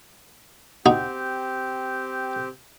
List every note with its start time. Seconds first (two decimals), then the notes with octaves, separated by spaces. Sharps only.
0.86 C4 D#4 F#4 G4